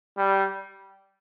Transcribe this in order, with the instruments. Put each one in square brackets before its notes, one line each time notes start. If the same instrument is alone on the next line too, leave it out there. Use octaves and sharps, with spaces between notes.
[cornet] G3